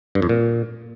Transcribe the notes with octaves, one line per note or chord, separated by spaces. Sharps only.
G2
F2
A#2